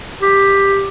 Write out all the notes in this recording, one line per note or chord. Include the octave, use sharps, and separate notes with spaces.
G4